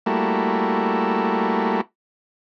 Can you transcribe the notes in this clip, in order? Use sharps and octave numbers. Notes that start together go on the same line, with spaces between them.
G3 A3 A#3 E4 F#4